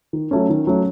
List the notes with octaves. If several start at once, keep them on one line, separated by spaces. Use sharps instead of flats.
D#3
F#3 A3 C#4
D#3
F#3 A3 C#4